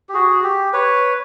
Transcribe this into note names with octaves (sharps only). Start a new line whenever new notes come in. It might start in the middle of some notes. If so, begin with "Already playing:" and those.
G4
F#4 G#4
G4
B4 C#5